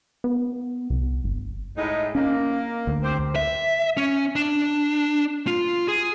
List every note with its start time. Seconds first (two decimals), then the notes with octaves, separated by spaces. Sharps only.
0.24 B3
0.90 C2
1.24 G1
1.76 A2 G#3 D#4
2.15 A#3 C#4
2.87 D2
3.03 C4 G4 C5
3.36 E5
3.97 C#4
4.36 D4
5.47 F4
5.88 G#4